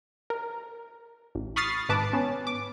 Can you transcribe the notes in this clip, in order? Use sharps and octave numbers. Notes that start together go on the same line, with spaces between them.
A#4
A1
B5 C#6 D#6 F6 A6 C7
G#1 G#2 B4 A5 D6
B3 C#4
D6